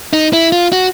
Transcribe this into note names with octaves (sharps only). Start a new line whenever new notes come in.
D#4
E4
F4
F#4